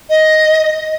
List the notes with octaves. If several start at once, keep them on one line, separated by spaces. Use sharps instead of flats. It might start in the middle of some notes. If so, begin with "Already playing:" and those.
D#5